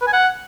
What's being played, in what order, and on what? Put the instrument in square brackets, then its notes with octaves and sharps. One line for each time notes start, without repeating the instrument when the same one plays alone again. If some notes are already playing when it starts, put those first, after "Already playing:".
[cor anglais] B4
G#5
F#5